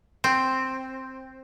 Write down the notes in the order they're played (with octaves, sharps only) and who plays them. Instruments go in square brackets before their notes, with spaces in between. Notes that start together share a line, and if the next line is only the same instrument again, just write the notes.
[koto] C4